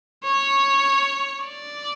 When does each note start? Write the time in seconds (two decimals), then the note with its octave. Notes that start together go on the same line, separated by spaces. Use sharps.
0.24 C#5
1.45 D5